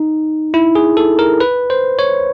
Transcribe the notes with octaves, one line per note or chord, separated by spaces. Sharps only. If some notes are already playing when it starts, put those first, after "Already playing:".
Already playing: D#4
E4
G#4
A4
A#4
B4
C5
C#5